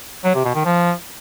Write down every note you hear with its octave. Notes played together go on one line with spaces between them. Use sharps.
F#3
C3
B2
D#3
F3